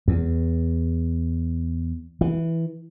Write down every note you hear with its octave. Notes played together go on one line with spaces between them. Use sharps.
E2
E3